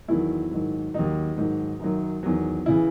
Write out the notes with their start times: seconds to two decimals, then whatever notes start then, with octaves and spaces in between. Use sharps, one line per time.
0.08 E2 D#3 F#3 E4
0.51 G#2 D#3 F#3
0.94 D#2 D#3 F#3 D#4
1.37 G#2 D#3 F#3
1.80 F#2 D#3 F#3
2.23 E2 D#3 F#3
2.66 C#3 E3 E4